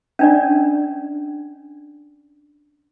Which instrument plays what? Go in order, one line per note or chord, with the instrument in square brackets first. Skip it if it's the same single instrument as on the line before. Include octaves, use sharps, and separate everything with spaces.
[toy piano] C#4 D4 D5